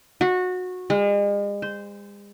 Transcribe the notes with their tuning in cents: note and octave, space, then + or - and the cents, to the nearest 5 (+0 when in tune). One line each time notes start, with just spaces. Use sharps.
F#4 -20
G#3 -40
C5 -15